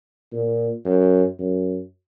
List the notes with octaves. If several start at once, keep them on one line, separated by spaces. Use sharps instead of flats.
A#2
F#2
F#2